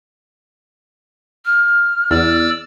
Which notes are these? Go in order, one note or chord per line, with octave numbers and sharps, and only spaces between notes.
F6
E2 D5 E6